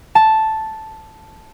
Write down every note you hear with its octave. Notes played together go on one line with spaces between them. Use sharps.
A5